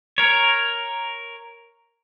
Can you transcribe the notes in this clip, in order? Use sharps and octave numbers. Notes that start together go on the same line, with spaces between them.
A#4 C#5